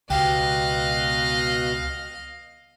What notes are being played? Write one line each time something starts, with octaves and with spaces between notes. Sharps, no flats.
C#2 B2 G4 D#5 F5 F#6